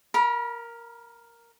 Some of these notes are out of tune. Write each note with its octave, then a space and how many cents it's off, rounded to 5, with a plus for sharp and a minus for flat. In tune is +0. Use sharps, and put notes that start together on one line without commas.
A#4 +0 B5 -35